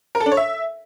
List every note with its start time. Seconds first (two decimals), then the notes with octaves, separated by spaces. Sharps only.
0.15 A#4
0.20 A4
0.26 D4
0.32 C#5
0.37 E5